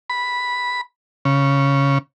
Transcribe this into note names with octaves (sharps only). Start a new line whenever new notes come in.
B5
C#3